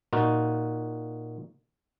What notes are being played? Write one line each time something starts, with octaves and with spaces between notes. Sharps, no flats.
A#2 D#4 F4 F#4